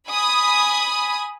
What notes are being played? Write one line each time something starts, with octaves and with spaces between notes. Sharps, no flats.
G#5 B5 D#6